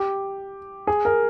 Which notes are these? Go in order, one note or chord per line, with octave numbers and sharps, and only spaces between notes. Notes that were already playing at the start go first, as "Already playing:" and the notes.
Already playing: G4
G#4
A#4